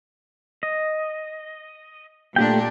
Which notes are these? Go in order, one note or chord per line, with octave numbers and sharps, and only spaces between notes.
D#5
A#2 A3 D4 G4 G5